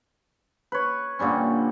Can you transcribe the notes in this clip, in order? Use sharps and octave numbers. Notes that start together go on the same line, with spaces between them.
B4 C#5
A#2 D3 G3 C#4